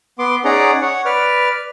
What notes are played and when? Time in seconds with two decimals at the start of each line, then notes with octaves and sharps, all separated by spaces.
0.19 B3 C6 D6
0.45 C#4 D#4 G#4 D5 F#5 A#5
0.82 C#5 F#5
1.05 B4 D5 F6